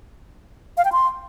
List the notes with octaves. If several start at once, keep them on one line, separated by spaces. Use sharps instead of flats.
F5
G5
C6